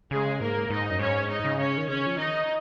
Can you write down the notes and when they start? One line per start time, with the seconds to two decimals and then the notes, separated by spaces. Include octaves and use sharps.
0.11 C#3 G#3 G#4
0.41 G#2 A#3 A#4
0.70 G#2 D#4 D#5
0.90 F#2
0.99 G#2 C#4 C#5
1.29 D#4 D#5
1.45 C#3
1.59 C#4 C#5
1.77 D#3
1.88 C#3 C#4 C#5
2.06 F3
2.17 D#3 D#4 D#5